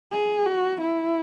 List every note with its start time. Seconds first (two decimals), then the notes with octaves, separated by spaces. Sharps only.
0.12 G#4
0.46 F#4
0.81 E4